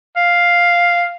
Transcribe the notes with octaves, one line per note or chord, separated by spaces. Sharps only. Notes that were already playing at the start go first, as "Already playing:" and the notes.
F5